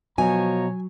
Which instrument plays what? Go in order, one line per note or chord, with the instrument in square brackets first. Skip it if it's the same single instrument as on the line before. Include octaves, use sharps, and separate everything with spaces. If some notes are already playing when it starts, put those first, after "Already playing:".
[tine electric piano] B2 [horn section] F3 C#5 A#5 [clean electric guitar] F#3 [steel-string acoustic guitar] G#5